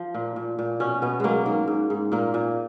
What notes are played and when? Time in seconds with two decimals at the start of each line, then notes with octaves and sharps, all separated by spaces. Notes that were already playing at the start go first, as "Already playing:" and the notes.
Already playing: F3
0.14 A#2
0.36 A#2
0.59 A#2
0.80 B2 C#4
1.02 B2 B3
1.20 F#3 G#3 A#3
1.46 G#2 A#3
1.68 G#2
1.90 G#2
2.12 A#2 A#3
2.34 A#2